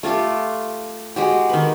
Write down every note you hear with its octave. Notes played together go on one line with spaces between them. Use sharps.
A3 F4 G4 A4
G#3 F#4 G4
D#3 B4